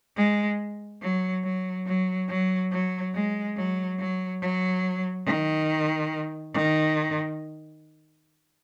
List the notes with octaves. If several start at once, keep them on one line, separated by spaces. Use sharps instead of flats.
G#3
F#3
F#3
F#3
F#3
F#3
G#3
F#3
F#3
F#3
D#3
D#3